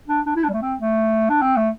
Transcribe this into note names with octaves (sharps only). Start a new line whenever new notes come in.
D4
D4
E4
D4
G3
A3
C4
A3
D4
C4
A3